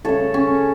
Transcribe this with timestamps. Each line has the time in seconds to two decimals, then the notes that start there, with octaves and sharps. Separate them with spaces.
0.05 C#3 A3 A4 C#5
0.34 C#4